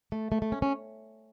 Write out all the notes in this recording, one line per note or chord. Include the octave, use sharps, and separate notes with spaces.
A3
A3
A3
C#4
C#4